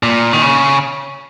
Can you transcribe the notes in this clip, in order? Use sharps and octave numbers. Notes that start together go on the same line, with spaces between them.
A#2
D#3
C#3